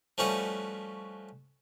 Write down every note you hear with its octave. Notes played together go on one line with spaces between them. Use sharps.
F3 G3 A3 C#4 F#4 B4